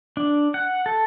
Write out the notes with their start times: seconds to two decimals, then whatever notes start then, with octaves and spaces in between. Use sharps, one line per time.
0.17 D4
0.54 F#5
0.86 A4